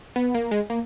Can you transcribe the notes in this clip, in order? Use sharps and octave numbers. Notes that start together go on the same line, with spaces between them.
B3
A#3
G#3
A#3